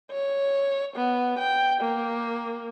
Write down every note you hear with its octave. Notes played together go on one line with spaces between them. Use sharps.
C#5
B3
G5
A#3